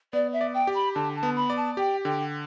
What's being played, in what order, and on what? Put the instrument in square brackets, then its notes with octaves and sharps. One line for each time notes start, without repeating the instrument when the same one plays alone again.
[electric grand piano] B3 [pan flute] D5
[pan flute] E5
[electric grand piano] D5
[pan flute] G5
[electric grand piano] G4
[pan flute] B5
[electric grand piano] D3 [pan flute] A5
[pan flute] A5
[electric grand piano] B3
[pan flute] B5
[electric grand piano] D5
[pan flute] A5
[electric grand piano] G4 [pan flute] G5
[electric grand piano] D3 [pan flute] G5